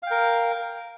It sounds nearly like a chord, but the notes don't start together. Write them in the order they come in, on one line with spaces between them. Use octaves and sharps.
F5 G5 A#4